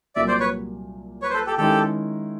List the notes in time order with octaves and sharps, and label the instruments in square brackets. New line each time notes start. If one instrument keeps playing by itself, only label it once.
[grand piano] C2 A#2 F#3 A#3 [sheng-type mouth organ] D5 E5
[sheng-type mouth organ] C5 D5
B4 C#5
B4 C#5
C5
A4 B4
G4 A4
[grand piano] D#3 G#3 C#4 E4 [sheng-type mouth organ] G4 A4